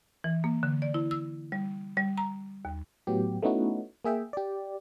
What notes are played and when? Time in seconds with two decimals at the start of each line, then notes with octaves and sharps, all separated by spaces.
0.24 E3
0.44 A#3
0.63 D3
0.82 D5
0.94 E4
1.11 E6
1.52 G3
1.97 G3
2.18 A#5
2.65 D#2
3.07 A2 F#3 B3 G4
3.43 A3 B3 C#4 D#4 E4 F#4
4.05 A#3 G#4 E5 G5
4.33 G4 D5